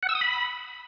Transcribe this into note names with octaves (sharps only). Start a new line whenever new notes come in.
F#5
E6
D#6
B5